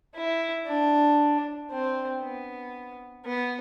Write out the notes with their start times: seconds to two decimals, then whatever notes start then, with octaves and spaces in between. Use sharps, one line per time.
0.15 E4
0.67 D4
1.70 C4
2.21 B3
3.25 B3